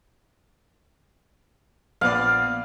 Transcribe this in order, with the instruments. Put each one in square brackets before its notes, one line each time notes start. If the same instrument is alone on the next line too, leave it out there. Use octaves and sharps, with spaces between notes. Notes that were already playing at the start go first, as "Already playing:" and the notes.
[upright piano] A#1 B3 D5 [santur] F5